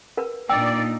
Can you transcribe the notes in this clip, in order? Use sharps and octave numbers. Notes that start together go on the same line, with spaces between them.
A#4 B4
A#2 D4 D#4 D5 G5 E6